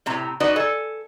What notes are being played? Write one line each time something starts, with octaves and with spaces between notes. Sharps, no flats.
A2 C3 A#5
D#4 F#4 B4 D5 D#5
A4 G#5